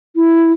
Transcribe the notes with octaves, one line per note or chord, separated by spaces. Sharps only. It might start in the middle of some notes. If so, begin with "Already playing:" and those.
E4